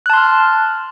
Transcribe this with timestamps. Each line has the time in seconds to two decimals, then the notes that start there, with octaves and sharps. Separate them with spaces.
0.06 F#6
0.10 A5
0.13 C6
0.17 F6